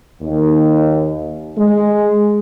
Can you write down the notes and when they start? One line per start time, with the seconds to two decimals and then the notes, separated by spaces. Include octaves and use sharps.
0.21 D#2
1.57 G#3